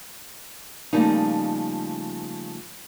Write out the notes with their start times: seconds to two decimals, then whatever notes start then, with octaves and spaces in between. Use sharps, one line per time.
0.93 C#3 F3 G3 A3 A#3 D#4